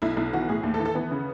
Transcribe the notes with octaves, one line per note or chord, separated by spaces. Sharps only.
B1 E4
B1 E4
E3 F#4
A2 G#4
D#2
A4
E3
A4
E3 B3
C#3